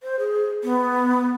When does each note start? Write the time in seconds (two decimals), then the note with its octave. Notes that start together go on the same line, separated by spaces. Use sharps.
0.03 C5
0.19 G#4
0.64 B3